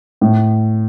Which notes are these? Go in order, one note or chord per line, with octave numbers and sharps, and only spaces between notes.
A2